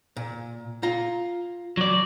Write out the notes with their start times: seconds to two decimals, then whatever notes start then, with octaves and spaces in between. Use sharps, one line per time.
0.17 A#2
0.83 F4 A#5
1.77 F#3 D5